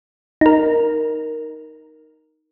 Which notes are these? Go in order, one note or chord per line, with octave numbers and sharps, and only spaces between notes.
D#4 A#4